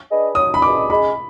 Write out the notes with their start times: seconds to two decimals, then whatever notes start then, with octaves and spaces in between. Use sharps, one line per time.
0.09 D4 G#4 B4 D#5
0.35 F#3 D#6
0.54 B5
0.62 D4 G#4 B4 D#5 D6
0.90 G#3 B5